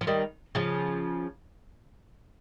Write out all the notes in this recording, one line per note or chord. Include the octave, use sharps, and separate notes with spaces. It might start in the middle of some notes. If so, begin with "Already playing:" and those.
F3
D#3 G3
C#3 F3